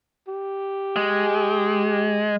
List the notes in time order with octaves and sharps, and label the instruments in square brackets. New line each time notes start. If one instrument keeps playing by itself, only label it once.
[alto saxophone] G4
[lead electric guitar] G#3